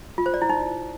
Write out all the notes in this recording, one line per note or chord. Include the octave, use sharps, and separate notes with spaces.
F4
C5
D5
E4
D#4